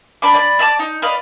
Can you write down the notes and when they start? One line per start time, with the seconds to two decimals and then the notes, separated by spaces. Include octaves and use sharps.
0.22 D4 B5 D6
0.34 D5 B5
0.59 D5 E5 A5 D6
0.79 D#4
1.02 B4 D5 D#5 F5